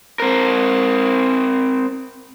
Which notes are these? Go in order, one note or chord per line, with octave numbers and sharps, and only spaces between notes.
C4 A#4